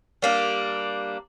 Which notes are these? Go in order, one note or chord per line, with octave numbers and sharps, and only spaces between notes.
G3 A#3 D4